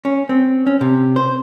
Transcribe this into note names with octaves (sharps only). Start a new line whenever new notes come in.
C#4
C4
C#4
C3
C5